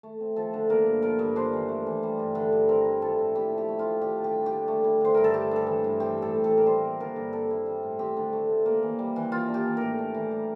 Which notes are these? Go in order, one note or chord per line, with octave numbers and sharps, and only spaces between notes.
A3
C4
F3 A4
D3
A#3 A#4
G2
F3 A#4
G2
D4 C5
E3
A3
E3
G3
G2
D3
G2
C4 A#4
E4
F3 A4
A2
E4 G4
F3
G4
A3
F4
F3
D4 G4
D3
G4
G3
G4
D3
A3
E4
D3 C5
G2 A#4
A4
A3 G4
G2 A4
E3
G2
C4 G4
A2 A4
G3
A4
A2
A#4
G3 C5
A#3
D3 A#4
G2
C4 A4
E4
G3
A2
C4 G4
D3
A3
D3
A#3
E3
G3
E3
A#3 F4
D4
G4
E3
A2 A#4
D4
E3
G3